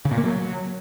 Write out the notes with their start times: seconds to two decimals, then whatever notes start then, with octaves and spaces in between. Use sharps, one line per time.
0.05 C#3
0.11 A#2
0.18 A#3
0.24 F#3